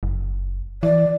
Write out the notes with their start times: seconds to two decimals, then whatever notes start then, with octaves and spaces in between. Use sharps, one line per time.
0.03 F#1
0.83 E3 D5